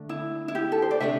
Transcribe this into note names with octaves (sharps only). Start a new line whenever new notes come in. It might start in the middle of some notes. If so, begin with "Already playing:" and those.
Already playing: D3 A3 D4
E4
E4
G4
A4
C5
D5
C3 A3 D4 G4 E5